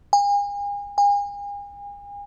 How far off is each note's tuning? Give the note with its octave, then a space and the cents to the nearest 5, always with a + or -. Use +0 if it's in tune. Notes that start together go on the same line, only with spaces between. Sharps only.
G#5 -40
G#5 -40